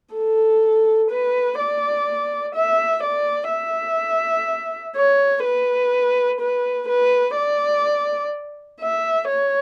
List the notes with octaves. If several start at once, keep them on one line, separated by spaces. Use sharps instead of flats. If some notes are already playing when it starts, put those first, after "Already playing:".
A4
B4
D5
E5
D5
E5
C#5
B4
B4
B4
D5
E5
C#5